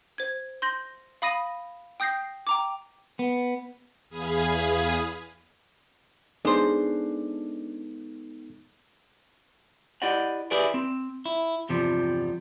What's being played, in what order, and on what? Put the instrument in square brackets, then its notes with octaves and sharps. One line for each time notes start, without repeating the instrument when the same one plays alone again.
[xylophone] C5 G#6
C6 G6 A#6 F#7
F5 B5 D#6 A#6 D#7
G5 D#6 G6 A#6 C7
G5 A#5 D6
[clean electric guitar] B3
[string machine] E2 G#4 F5 B5 D#6 G#6
[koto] G#3 [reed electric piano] B3 D#4 A4 [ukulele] D4 C5
[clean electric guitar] E4 G4 D5 D#5 F#5
E4 G4 G#4 B4 D5
C4
E4
E2 G2 C3 F3 G3